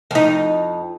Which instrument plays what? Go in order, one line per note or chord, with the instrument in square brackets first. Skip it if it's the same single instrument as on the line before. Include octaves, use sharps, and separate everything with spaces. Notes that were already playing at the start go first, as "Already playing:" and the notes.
[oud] F2 D#4